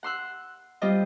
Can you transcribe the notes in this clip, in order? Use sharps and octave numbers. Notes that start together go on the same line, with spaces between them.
F#5 C6 E6 F#6
G3 C4 F4 C5 D#5